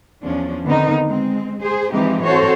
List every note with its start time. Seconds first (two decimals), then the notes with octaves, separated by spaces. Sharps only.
0.22 E2 F3 C#4 D4
0.65 D3 D#3 B3 C4 D#4 A#4
1.06 G#3 C4
1.62 G#4 C5
1.93 E3 F3 G#3 C4 D#4 G4
2.24 C4 F#4 A4 C5 C#5